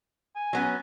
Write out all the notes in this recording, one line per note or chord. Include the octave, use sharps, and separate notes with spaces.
G#5
F#3 B3 C#4